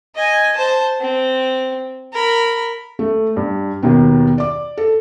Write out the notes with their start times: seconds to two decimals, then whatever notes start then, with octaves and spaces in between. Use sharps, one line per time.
0.15 D#5 G#5
0.56 C5 A5
1.00 C4
2.12 A#4 B5
2.99 A3
3.36 G2
3.82 D#2 B2 D#3 B3
4.38 D5 D6
4.77 A4